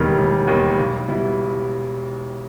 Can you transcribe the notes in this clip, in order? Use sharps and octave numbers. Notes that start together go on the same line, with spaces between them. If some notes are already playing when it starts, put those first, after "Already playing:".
Already playing: E1 D#2 D#3 G3 B3
E1
D#2 D#3 G3 B3
B1
B2 G3 B3 E4